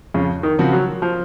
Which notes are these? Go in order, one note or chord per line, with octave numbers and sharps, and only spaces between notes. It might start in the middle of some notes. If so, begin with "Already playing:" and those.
F2 C#3
D#3
C#3 F3 C4 F#4
F#3
F3